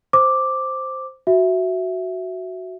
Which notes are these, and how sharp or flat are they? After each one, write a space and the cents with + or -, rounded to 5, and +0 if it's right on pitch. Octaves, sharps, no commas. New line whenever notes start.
C5 +0 D6 +0
F#4 +0 E5 +0